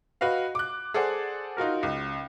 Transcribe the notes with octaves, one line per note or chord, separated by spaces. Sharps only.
F#4 B4 D#5 F5
D6 F#6
G#4 A4 C5 D5 F#5
D#4 F4 F#4 A#4
C#2